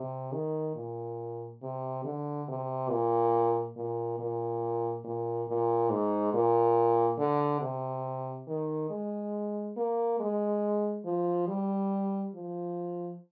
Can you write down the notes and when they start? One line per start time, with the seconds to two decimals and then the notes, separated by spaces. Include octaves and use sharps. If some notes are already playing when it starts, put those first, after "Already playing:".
Already playing: C3
0.33 D#3
0.76 A#2
1.62 C3
2.05 D3
2.48 C3
2.90 A#2
3.77 A#2
4.19 A#2
5.04 A#2
5.48 A#2
5.90 G#2
6.34 A#2
7.19 D3
7.62 C3
8.48 D#3
8.90 G#3
9.77 A#3
10.20 G#3
11.05 F3
11.48 G3
12.34 F3